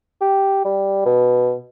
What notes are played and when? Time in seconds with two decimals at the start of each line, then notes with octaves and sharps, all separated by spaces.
0.21 G4
0.65 G3
1.05 B2